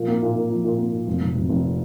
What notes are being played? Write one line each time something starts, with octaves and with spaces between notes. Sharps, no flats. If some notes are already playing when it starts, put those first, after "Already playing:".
Already playing: A#2 F3
A#3
A#2
A#2
F3
A#2
A#3
A#2
F1
F1
F1
F1